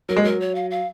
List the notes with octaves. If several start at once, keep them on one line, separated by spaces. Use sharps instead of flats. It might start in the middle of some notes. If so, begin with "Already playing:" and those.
F#3 A#4
G#3
F#3 A#4
C#5
F5
F5